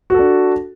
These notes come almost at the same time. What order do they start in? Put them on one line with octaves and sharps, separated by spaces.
F#4 A4 D4